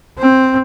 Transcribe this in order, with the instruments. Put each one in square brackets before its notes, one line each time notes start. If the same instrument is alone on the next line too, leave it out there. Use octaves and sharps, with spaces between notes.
[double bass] C4